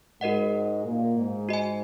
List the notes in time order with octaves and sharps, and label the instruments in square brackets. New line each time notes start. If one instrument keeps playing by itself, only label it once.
[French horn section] G#2 G#3 [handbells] F#4 A#4 D#5 F#5
[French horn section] A#2 A#3
G#2
[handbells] F#4 D#5 G#5